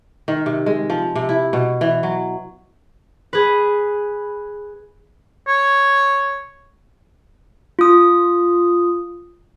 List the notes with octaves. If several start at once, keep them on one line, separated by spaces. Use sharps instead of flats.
D#3
C3
G#3
F3
C3
E4
B2
E3
F#3
G#4 B4
C#5
F4 D#6